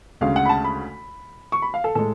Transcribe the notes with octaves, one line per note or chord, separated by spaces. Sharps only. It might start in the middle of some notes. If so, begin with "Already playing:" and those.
D2 C#3 G#3 F5
F#5
B5
A5
B5
C#6
B5
F5
A4
A2 G#3 A4